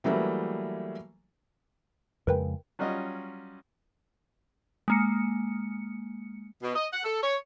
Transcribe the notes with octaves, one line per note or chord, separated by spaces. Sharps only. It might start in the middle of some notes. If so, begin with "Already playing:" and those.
E3 F#3 G3 A3 A#3
F2 C#3 G#3 A#4 B4 G5
F#3 G3 C#4 F4 D#5
G#3 A#3 C#7
B2
D#5
F#5
A4
C#5